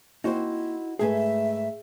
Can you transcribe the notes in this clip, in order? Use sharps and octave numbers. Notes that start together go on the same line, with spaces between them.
A#3 C4 D#4 E4 F#4 C5
G#2 A3 G#4 B4 E5 G#5